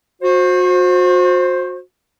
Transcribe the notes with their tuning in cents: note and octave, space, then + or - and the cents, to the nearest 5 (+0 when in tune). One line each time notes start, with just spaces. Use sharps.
F#4 -35 C5 +10